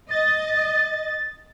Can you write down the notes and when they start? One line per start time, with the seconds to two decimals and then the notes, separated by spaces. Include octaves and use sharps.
0.11 D#5 A6